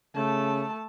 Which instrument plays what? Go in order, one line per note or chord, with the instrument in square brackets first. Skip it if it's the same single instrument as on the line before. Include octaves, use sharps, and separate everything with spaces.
[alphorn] C#3 [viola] A3 A5